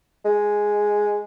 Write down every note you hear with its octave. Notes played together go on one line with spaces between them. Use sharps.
G#3